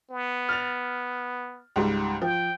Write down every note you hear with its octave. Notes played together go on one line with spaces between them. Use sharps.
B3
F6 A6 F7
C#2 G#2 G3
F3 G5